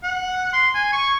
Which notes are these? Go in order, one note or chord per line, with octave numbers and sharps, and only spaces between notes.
F#5
C6
G#5
C#6